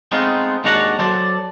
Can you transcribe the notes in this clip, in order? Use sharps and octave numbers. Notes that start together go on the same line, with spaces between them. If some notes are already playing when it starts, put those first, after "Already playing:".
G#3 A3 B3 C4 D#4 F4
D#2 G#3 D4 F#4 F#5 A#5
F#3 A4 C5 D5